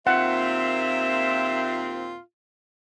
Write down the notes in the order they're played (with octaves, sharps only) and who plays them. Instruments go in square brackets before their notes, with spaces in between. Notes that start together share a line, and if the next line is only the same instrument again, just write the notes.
[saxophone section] D#2 A#2 C4 [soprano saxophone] F4 [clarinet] E5 [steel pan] F#5